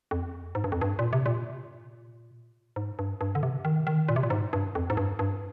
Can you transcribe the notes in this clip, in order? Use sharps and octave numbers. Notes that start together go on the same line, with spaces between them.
F2
G#2
G2
F2
G2
A#2
C3
A#2
G#2
G2
G2
D3
C3
D#3
D#3
A#2
C3
A#2
G#2
G2
F2
G#2
G2
G2